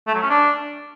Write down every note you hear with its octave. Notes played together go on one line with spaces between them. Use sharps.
A3
F#3
C#4
D4